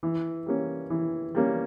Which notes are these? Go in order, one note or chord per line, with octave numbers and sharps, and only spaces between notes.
E3
G3 A#3 C#4
E3
G3 A#3 C#4